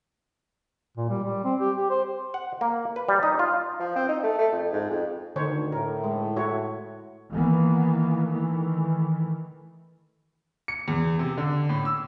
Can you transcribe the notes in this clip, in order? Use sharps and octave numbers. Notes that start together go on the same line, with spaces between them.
A#2
G3
G3
C4
G4
G4
C5
F#5
A#3
B4
G3
D#4
F4
F3
C4
D#4
A3
A3
F2
G#2
F2
D2 D3 D#3 C5 C#5
A2 A#4
G#3
E4 F#4 C#5
D#3 E3 A#3 B3
D#3 E3 A3
C#7
E2
C3
D3
A2
E6